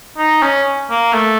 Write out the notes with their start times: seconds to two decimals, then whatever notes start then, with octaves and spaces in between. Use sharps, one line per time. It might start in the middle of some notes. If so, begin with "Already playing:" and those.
0.18 D#4
0.43 C#4
0.90 A#3
1.13 A3